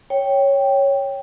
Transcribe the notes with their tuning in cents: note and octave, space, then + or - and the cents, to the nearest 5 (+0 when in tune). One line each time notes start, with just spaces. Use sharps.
C#5 +0 G5 +0